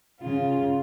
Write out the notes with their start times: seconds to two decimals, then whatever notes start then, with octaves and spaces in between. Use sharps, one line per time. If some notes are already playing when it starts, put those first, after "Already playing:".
0.20 C#3 F4